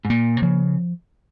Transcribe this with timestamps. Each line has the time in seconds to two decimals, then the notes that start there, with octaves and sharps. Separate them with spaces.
0.05 G#2
0.10 A#2 A#3
0.37 C3
0.42 C#3 F3